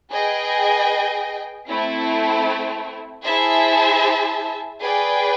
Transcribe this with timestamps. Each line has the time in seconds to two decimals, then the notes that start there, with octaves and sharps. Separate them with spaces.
0.11 G#4 B4 D#5 G5
1.68 A3 C4 E4
3.24 E4 G#4 C5 E5 A5
4.81 G#4 B4 D5 G5